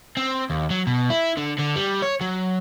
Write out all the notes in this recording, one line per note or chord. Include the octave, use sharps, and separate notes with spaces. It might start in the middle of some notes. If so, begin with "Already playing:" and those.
C4
D#2
F#3
B2
E4
D3
D3
G3
C#5
F#3